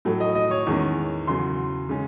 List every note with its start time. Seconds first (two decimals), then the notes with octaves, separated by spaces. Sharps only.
0.05 A2 F#3 A3
0.20 D#5
0.35 D#5
0.51 C#5
0.67 E2 D#3 G#3 C#4
1.27 E2 C#3 F#3 C6
1.89 C#3 G#3 C#4